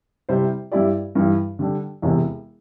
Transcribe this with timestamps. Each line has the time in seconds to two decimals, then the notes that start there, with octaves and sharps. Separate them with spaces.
0.29 C3 G3 E4 C5
0.72 G2 G3 E4 G4 D5
1.15 G2 E3 G3
1.59 D3 G3 D4
2.02 E1 E2 C3